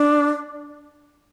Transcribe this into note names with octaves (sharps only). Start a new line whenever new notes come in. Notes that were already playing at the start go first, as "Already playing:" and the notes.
Already playing: D4